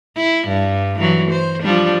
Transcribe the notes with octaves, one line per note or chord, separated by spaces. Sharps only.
E4
G2
E3 F#3
C5
F3 G3 D4